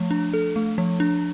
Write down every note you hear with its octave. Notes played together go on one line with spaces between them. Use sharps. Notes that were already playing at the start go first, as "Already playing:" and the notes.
Already playing: F3 A3
D4
A4
A3
F3
D4